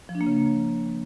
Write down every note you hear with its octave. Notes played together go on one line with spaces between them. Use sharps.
F3
D4
A#3
C#3